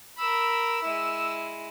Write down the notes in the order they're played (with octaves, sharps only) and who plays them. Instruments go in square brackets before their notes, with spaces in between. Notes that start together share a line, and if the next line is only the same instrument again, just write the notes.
[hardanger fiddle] A#4 B5 [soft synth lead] E6
[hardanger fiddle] G#3 E4